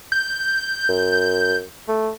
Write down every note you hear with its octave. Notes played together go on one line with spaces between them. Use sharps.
G6
F#2
A3